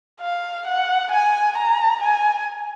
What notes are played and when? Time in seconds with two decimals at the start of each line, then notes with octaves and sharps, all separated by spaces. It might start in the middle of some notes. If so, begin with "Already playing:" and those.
0.21 F5
0.67 F#5
1.11 G#5
1.57 A#5
2.02 G#5